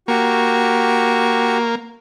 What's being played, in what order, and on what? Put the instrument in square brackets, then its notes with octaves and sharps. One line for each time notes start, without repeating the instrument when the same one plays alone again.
[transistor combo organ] A#3 [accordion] F#4 G4 C#6